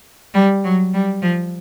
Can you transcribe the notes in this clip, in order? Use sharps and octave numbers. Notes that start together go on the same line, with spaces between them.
G3
F#3
G3
F3